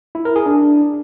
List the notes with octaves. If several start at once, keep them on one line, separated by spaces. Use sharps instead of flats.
E4
A#4
G#4
D4